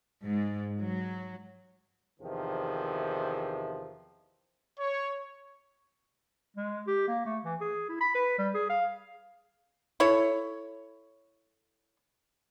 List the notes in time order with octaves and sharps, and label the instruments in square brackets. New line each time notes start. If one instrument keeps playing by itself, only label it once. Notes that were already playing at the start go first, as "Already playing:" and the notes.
[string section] G#2
F#3
[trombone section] E2 C3 D#3 F3
[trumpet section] C#5
[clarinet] G#3
G4
A#3
A3
E3
G#4
E4
B5
B4
G3
G#4
F5
[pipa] E4 A4 C#5